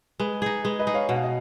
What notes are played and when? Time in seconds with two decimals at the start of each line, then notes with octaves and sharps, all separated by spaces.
0.20 G#3 B4
0.42 D#4 G#4
0.65 G#3 B4
0.79 B4 D#5
0.87 D#4 G#4
0.94 C#5 F5
1.09 B2 F#5
1.16 F5
1.23 D#5